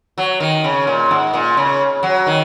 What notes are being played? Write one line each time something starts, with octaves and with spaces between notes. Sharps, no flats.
F#3
D#3
C#3
A#2
G#2
A#2
C#3
F#3
D#3